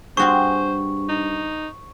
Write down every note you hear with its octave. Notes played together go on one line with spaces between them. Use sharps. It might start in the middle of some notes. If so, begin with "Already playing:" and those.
G2 C4 F#4 G#4 C5 C#6
D#4